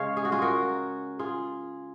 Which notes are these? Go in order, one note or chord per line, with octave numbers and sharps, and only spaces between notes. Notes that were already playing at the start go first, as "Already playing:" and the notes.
Already playing: C#3 G#3 C#5 F5
G#4
F#4
F4 G#4
F#4 A#4
F4 G#4